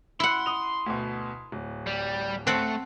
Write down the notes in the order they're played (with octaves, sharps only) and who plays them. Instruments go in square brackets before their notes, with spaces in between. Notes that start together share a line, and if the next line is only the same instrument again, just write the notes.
[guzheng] E4 F#5 [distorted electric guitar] C6
[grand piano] D#6 F7
D2 B2
D1
[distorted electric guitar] G3
[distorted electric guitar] A3 [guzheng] C4 F#5 A5